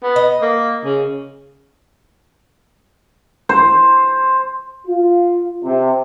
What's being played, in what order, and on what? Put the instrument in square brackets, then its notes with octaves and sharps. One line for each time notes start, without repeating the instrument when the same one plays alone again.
[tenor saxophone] B3
[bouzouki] D#5
[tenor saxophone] A#3
C#3
[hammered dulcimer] C5
[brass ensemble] F4
C3